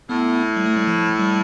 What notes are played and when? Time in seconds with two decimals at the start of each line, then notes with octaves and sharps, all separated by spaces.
0.09 A2 B3
0.57 G3
0.66 A3
0.76 G3
0.87 F3
1.19 G3